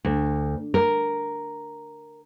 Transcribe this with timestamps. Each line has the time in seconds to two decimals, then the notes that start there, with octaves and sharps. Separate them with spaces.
0.05 D2
0.74 A#4